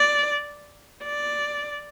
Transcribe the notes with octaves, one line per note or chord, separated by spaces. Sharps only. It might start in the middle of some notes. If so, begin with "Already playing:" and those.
Already playing: D5
D5